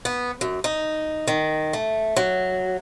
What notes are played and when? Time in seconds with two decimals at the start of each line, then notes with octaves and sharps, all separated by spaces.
0.05 B3
0.41 F#2
0.64 D#4
1.28 D#3
1.73 A3
2.17 F#3